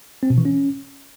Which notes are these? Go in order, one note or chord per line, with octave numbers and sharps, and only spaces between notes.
C4
B2
E3
C#4